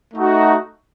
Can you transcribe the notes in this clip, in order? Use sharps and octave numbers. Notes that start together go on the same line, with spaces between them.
A3 D#4 F#4